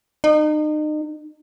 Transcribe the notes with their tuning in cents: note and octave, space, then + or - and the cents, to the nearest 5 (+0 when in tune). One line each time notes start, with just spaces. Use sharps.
D#4 -35